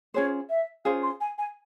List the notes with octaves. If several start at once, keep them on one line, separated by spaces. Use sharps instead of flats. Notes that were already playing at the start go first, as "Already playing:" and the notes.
C#4 F4 G#4 C5 C#5
E5
C#4 F4 G#4 C5 F5
C6
G#5
G#5